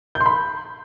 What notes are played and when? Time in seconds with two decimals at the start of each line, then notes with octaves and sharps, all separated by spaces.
0.15 G6
0.20 C6
0.26 B5